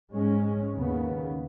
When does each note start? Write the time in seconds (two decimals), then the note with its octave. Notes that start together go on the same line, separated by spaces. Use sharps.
0.14 G#2 G#3 C#4
0.74 D#2 C#3 B3